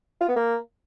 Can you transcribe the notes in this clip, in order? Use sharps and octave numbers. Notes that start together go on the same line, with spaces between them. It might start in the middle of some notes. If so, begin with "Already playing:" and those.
F4
B3
A#3